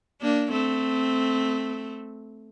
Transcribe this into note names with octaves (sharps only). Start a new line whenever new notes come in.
A#3 D4
A3 C4